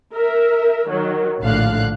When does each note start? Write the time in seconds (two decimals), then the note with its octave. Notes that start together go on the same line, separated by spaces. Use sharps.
0.13 A#4 E5
0.88 D#3 F#3
1.41 A#1 A2 D3 F5 F#6